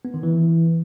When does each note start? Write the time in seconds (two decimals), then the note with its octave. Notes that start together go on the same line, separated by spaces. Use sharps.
0.05 B3
0.14 D#3
0.23 E3